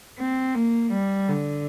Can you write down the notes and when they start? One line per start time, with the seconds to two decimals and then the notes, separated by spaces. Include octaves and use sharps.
0.19 C4
0.55 A#3
0.92 G3
1.28 D3